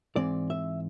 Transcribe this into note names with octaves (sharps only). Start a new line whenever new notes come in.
G#2 E3 G#3 C4 D5
E5